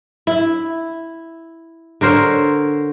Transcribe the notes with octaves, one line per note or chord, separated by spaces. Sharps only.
E4
D3 A#4 C5 C#5